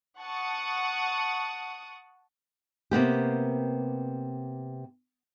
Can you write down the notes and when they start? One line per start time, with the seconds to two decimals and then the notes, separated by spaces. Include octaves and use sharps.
0.19 F#5 A5 C#6 D#6
2.91 C3 A#3 B3 G4